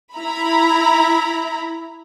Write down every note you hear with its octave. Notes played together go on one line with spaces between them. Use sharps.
E4 A#5 B5